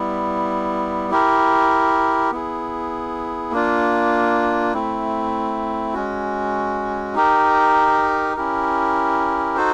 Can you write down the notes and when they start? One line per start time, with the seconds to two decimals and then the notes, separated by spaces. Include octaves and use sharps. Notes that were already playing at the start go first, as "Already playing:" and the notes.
Already playing: G3 B3 E4
1.10 E4 G4 A#4
2.31 B3 E4 G#4
3.52 A#3 D4 F4
4.74 A3 C4 E4
5.94 G#3 C#4 F#4
7.15 D#4 G4 A#4
8.36 C#4 E4 G4 A#4
9.57 D#4 F#4 A4 C5